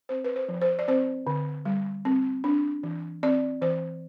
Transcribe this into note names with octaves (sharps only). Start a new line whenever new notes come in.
C4 C5
B4
C5
F3
C5
D5
C4 C5
D3
G3
C4
D4
E3
C4 D5
E3 C5